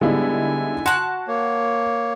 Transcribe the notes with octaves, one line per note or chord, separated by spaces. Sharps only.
D3 G3 G#3 B3 D#4 E4 G#5
F#4 A5 C6 F#6
A#3 C#5